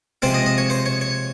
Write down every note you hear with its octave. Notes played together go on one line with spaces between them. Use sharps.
C3 F3 G#3 C4 C5
D#5
D#5
C#5
C5
C#5
C#5